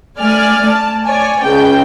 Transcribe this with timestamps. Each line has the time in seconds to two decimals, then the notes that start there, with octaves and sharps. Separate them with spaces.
0.20 A3 D5 G#5 F6
0.70 A5
1.07 C#5 D5 G#5
1.43 C#2 C#3 G5